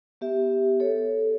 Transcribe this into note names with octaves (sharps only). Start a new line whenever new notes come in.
B3 G4 E5
A4 C#5